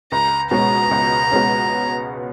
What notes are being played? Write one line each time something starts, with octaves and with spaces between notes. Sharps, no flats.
C#2 A#5
B2 G#3 C#4 A#5
C#2
B2 G#3 C#4